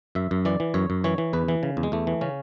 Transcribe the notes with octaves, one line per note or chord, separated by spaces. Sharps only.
F#2 E5
F#2
E3 D5
E3
F#2 C#5
F#2
E3 C#5
E3
E2 B4
E3
C#3
E2
G#3
E2 A3
E3
C#3 C#4